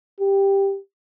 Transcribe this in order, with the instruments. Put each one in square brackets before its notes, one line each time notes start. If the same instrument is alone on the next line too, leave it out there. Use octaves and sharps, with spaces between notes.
[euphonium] G4